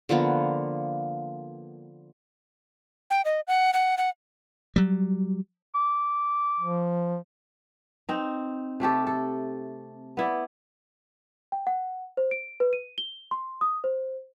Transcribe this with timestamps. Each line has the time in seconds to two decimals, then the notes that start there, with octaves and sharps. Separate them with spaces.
0.09 D3 F3 A#3 B3
3.10 G5
3.25 D#5
3.48 F#5
3.73 F#5
3.98 F#5
4.76 F#3 G3
5.75 D6
6.60 F3
8.09 C4 D#4
8.80 C3 A3 G4 A4
9.07 A4
10.17 B3 E4 D5
11.52 G5
11.67 F#5
12.17 C5
12.31 D7
12.60 B4
12.73 D#7
12.98 G7
13.31 C6
13.61 D#6
13.84 C5